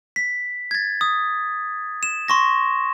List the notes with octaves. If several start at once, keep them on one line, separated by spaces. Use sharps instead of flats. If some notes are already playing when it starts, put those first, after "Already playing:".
B6
G#6 A6
D#6
E7
C6 C#6 A#6